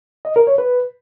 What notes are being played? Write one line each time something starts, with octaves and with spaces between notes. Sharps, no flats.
D#5
A#4
C#5
B4